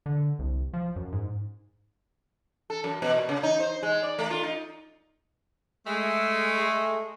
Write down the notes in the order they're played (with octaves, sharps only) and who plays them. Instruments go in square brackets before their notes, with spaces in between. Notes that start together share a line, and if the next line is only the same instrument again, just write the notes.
[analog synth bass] D3
C2
F3
F#2
G#2
[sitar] A4
F#2
B2
A#2
C#3
D#4
C5
G#3
D5
A3
F4
D#4
[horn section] G#3 A3